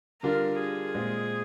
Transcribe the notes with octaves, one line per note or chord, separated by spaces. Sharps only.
D3 G3 D4 F4 A#4
G#4
A#2 G#3 C4 F4